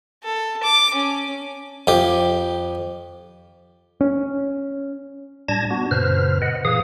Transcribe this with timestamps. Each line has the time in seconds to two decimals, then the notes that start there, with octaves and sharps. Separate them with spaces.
0.23 A4
0.63 D6
0.94 C#4
1.87 F2 G4
4.01 C#4
5.49 A2 G3 D4 A5 G#6 A#6
5.71 B3 D4 F#4
5.91 F#2 A#2 C#3 B4 C5 F6
6.42 B4 D#5 F#5
6.65 A#2 E3 G#4 F5 D#6